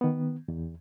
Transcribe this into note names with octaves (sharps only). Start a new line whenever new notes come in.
D#3 B3
E2